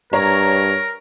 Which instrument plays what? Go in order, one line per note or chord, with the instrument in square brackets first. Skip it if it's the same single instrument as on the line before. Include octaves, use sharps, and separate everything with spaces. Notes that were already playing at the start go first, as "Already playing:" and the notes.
[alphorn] G2 [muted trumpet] A#4 [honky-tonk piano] C#5 A#5